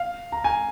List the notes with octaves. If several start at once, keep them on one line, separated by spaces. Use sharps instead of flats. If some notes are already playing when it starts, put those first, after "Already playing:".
Already playing: F5
A#5
G#5